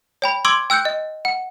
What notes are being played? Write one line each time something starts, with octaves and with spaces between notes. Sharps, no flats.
C#5 G5 B5
C6 D6 E6 G#6 D7 F#7
G5 E6 F#6 G6 C#7
D#5
F#5